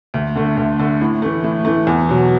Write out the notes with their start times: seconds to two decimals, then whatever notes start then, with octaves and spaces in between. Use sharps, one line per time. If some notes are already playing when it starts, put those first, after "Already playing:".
0.14 D2
0.36 D3 A3
0.57 D2
0.79 D3 A3
1.01 A2
1.22 E3 A3
1.44 A2
1.65 E3 A3
1.87 E2
2.09 B2 F#3